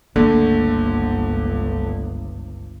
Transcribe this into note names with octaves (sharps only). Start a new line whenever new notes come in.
G1 C#2 D3 A3 A#3